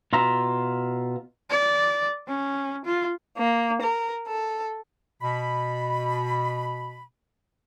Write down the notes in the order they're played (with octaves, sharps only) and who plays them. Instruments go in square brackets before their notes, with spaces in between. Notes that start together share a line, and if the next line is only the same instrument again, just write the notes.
[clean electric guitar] B2 F4 E5 A#5
[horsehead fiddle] D5
C#4
F4
[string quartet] A#3
A#4
A4
[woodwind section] B2 B5